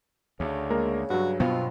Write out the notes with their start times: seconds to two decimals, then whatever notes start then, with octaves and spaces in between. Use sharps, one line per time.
0.40 D2 C#3
0.70 G#3 A#3 A#4
1.10 G2 F#3 F#4
1.40 B2 B3 C4 F4